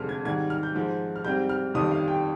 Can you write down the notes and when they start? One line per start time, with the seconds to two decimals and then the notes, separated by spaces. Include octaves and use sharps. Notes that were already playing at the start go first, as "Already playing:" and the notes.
Already playing: F1 F2 D3 G#3 F6
0.09 G#6
0.25 G#2 D#3 G3 G#6
0.50 F6
0.63 G6
0.75 G#2 F3 G#3
1.16 F6
1.24 G#2 G3 C4 G6
1.49 F6
1.74 G1 F2 D#3 G3 D#6
1.91 F5
2.08 G5